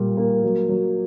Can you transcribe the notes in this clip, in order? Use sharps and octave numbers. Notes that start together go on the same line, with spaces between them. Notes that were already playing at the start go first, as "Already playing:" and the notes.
Already playing: A#2 G3 A#3
A#3
F#3
F#3